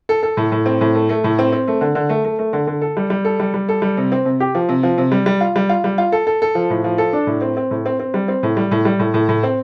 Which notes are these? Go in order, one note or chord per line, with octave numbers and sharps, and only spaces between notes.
A4
A4
A2
A2
C4
A2
A3
A3
A2
C4
C4
A3
D3
D3
A3
A3
A3
D3
D3
A4
G3
G3
A4
G3
G3
A4
G3
C3
C4
C3
G4
F3
C3
F3
C3
G3
G3
F4
G3
F4
G3
F4
A4
A4
A4
F3
A2
F3
A4
D4
A2
C4
C4
A2
C4
C4
G3
C4
A2
G3
A2
G3
A2
A2
A2
C4